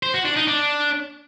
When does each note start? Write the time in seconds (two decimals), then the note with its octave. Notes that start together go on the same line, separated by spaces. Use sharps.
0.03 C5
0.14 F#4
0.25 D4
0.36 D#4
0.48 D4